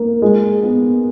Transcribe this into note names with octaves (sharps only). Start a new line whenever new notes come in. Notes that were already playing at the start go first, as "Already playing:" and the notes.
Already playing: A#3
G#3
B3